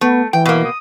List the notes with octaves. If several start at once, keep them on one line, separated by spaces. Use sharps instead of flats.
A3 B3
E3 G5
B2 A#3
D#6